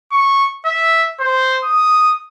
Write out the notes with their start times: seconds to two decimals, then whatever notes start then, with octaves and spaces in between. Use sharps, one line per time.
0.12 C#6
0.65 E5
1.20 C5
1.64 D#6